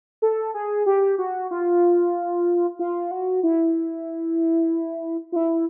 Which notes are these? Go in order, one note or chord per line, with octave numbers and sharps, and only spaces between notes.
A4
G#4
G4
F#4
F4
F4
F#4
E4
F4
E4